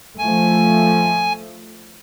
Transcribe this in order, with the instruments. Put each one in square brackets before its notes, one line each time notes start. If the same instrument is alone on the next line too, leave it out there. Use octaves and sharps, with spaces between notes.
[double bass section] F3 A3 [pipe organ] G#5